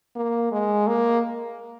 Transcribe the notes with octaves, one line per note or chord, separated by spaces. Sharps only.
A#3
G#3
A#3